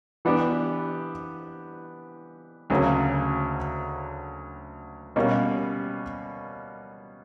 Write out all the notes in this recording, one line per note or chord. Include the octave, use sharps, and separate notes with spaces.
E3 B3 D4 G4
D2 C#3 F#3 A#3 C#4
B2 G3 A#3 C#4